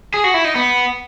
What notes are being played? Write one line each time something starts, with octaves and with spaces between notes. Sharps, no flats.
G#4
F#4
E4
D#4
B3